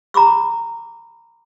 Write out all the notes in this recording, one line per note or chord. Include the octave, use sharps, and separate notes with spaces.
A#5 B5 D6 E6